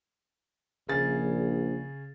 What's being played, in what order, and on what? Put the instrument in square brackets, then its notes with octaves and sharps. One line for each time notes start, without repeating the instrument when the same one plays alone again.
[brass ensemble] A#1 [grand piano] C#3 G#4 A6